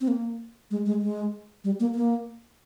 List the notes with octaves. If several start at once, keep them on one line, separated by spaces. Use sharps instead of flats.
C4
A#3
G#3
G#3
G#3
G3
A#3
A#3